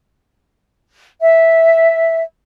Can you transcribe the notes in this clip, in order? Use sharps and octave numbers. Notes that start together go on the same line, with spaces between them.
E5